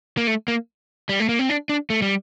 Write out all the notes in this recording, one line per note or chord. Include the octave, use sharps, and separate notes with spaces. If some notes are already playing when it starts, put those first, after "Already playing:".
A#3
A3
A#3
G3
A3
A#3
C4
D4
D4
A3
G3